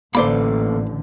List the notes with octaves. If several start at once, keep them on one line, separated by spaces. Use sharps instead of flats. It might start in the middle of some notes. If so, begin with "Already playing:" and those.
A1 D3 A#3 A4 B4 C5 D5 B5